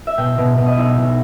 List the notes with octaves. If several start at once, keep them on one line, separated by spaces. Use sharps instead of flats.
E5
B2 G5
B2
B2
D#5
B1 E5
B1